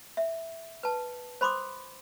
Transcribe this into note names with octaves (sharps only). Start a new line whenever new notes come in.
E5
B4 A5
C5 B5 C6 D6 D#6